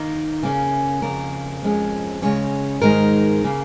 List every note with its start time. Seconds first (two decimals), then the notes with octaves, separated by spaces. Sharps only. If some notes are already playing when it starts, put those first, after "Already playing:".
Already playing: D#3 A#3 D#4
0.43 C#3 A#3 C#4
1.02 F2 C#3 A#3 A#4
1.62 F2 F3 G#3 C#4
2.22 C#3 G#3 C#4 C#5
2.82 G#2 D#3 G#3 D#4 A#4
3.44 C#3 A#3